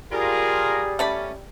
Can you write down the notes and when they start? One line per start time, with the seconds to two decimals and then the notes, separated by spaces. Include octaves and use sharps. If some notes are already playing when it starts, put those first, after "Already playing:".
0.12 G3 F4 G#4 A#4
0.99 A3 C#4 D5 B5